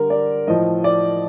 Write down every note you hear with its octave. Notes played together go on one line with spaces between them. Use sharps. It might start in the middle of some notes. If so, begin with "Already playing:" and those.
Already playing: D3 G3 A#4
D5
A2 F3 D#5
D5